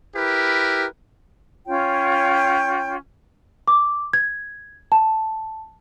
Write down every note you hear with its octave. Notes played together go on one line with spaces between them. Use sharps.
E4 G4 A#4 B4
C#4 F4 C#5 G5
D6
G#6
A5